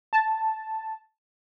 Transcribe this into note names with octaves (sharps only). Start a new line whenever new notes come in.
A5